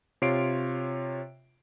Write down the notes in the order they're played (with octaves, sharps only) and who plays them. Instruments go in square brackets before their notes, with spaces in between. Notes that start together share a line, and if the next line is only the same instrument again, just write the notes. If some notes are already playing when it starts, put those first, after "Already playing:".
[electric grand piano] C3 F4 C#5 C7 D7